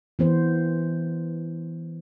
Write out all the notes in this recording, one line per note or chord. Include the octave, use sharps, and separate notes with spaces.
E3 B3 C5